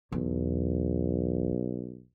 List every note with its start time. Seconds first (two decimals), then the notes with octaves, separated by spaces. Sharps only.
0.12 B1 E2